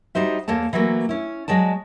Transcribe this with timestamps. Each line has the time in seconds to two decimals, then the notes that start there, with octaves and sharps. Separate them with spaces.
0.15 G3 D#4 F#4 C5 E5
0.48 E2 A#3 A4 C#5 A5
0.73 E3 F#3 A3 A#3 F#4
1.09 C#4 E4
1.48 F#3 G#3 D5 A5